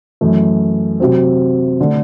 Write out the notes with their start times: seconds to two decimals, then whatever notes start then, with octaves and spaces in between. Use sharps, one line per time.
0.21 F#2 E3 A3
1.00 C3 F#3 C4
1.80 D3 A3